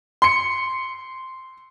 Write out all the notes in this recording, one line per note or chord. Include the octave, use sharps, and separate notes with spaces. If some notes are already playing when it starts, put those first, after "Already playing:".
C6 C#7